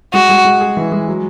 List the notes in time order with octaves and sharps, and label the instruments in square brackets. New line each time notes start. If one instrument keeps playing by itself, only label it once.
[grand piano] G#3 [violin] F#4
[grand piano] G#3
G#3
G#4
E3
G#3
F#3